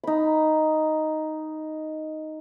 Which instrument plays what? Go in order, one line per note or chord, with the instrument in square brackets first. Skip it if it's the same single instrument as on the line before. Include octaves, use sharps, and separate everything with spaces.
[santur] D#4 B5